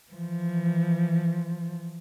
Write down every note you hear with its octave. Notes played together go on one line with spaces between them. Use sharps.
E3 F3